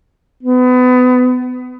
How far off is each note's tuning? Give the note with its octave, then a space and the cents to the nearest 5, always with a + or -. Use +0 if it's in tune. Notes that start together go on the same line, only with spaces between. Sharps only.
B3 +30